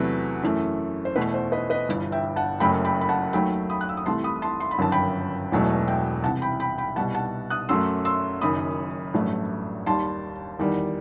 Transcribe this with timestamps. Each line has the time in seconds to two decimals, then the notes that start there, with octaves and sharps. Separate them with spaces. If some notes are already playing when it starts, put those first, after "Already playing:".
Already playing: E2 C3 F#3 A3 B4
0.43 F#2 E3 A3
1.05 C5
1.16 E2 B2 A3 B4
1.34 C5
1.52 B4 D#5
1.70 B4 D#5
1.88 G1 G2 E3
2.12 E5 G5
2.36 F#5 A5
2.60 F#1 F#2 F#3 A3 G5 B5
2.85 G5 B5
3.01 B5
3.09 F#5 A5
3.33 D#2 D#3 F#3 A3 G5 B5
3.70 B5 D#6
3.81 F#6
3.89 E6
3.97 D#6
4.06 C2 C3 E3 A3 A5 C6
4.24 B5 D#6
4.42 A5 C6
4.60 C6
4.71 B5
4.78 G1 F#2 D#3 F#3 A5
4.92 G5 B5
5.51 E1 E2 B2 F#3 A3
5.87 E5 G5
6.24 C2 C3 E3 F#5 A5
6.42 G5 B5
6.60 G5 B5
6.78 G5 B5
6.96 C2 B2 G3 F#5 A5
7.15 F#5 A5
7.50 D#6 F#6
7.69 F#2 F#3 A3 C6 E6
8.05 C6 E6
8.41 F#1 F#2 D#3 B5 D#6
9.14 A1 G2 F#3 A3
9.86 D#2 D#3 G3 A5 C6
10.59 E2 D#3 G3